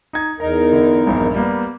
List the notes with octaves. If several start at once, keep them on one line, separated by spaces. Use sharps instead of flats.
D#4 G#6
E2 D#4 A#4 A#5
D3 E4
A#1 G2
G3 A#3 B3